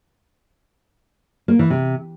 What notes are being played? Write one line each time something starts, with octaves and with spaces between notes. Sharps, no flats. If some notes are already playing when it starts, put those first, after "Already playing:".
A#3
E3
C3